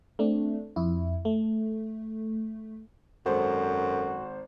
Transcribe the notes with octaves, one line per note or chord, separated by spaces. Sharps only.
A3 C4 D4
F2 E4
A3
G#1 F#2 F#4 A4 C5